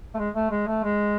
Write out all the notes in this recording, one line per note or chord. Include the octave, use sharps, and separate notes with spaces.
A3
G#3
A3
G#3
A3
G#3